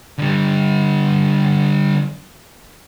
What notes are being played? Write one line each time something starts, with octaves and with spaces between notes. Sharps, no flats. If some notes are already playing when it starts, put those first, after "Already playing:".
D3 G3